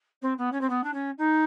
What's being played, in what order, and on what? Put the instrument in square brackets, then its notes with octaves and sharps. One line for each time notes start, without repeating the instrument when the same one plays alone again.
[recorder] C4
B3
C#4
C4
B3
D4
C#4
D#4